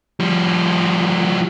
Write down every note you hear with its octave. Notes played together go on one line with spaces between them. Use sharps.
F3 G3